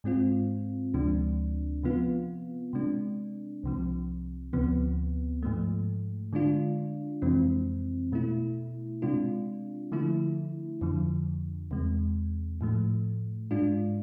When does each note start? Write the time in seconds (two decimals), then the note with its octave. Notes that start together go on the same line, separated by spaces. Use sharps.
0.04 G#2 G#3 C4 F4
0.94 D2 C3 F3 G#3 D4
1.83 C3 F3 B3 F4
2.73 C3 G#3 D4
3.63 C2 C3 F3
4.53 D2 C3 F3 B3
5.43 G#2 F3 A3
6.33 D3 G#3 D4 F4
7.22 F2 C3 E3 G#3 C4
8.12 B2 A3 E4
9.02 C3 G#3 D4 F4
9.92 D3 F3 A3 E4
10.81 F2 D3 F3
11.71 E2 C3 G#3
12.61 A2 F3 A3
13.51 G#2 G#3 D4 F4